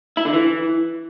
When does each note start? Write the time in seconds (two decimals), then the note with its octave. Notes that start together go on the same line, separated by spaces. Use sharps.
0.17 E4
0.25 D3
0.33 E3